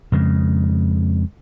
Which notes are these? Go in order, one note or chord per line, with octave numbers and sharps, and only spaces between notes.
F2 C#3 G#3